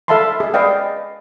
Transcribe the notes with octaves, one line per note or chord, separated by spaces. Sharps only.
A4 E5 F5 A5 B5 C6
G#4 D#5
G#4 B4 D5 D#5 F5 G5